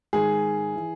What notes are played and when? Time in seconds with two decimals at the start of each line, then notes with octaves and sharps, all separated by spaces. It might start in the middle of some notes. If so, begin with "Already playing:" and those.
0.13 G#2 D#3 G#4
0.76 E3